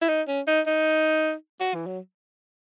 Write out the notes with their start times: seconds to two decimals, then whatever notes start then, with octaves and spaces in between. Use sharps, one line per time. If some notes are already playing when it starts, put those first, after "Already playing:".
0.02 E4
0.09 D#4
0.28 C#4
0.47 D#4
0.67 D#4
1.60 F#4
1.75 E3
1.86 F#3